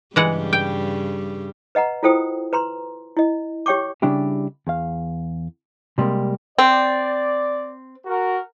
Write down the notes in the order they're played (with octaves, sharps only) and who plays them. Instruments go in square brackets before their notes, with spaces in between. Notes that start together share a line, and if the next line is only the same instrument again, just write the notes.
[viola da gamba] G2 C#3 G3 [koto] E3 G#3 F#5
[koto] G5
[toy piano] B4 D#5 F#5 A#5
E4 F4 A4 C5 G5 D#6
B4 A#5 C6
E4 D#5
G4 C#5 G5 C#6 D6
[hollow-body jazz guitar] C#3 G3 D4 E4 G4
E2 F5
C3 G3 G#3 A#3 A#4
[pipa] C4 [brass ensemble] D5
[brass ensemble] F#4 A#4